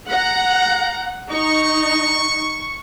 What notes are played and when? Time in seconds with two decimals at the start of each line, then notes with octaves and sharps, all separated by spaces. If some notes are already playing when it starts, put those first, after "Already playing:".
0.11 F#5 A#5
1.30 D#4 C#6